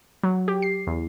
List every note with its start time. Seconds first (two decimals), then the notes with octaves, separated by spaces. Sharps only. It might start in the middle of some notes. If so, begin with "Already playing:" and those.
0.23 F#3
0.48 G4
0.62 C7
0.87 E2